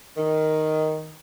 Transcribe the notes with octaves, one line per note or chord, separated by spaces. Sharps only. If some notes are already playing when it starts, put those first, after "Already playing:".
D#3